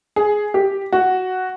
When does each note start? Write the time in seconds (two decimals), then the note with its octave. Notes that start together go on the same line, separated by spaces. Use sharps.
0.16 G#4
0.54 G4
0.92 F#4